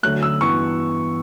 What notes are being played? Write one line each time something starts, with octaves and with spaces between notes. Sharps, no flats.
D2 D3 F#3 A3 F#6
E6
G2 E3 B3 C#6